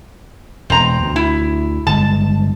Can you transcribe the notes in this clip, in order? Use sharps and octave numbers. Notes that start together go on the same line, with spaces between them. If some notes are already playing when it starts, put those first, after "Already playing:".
E1 C4 A#5
D2
E4
G1 G#3 A5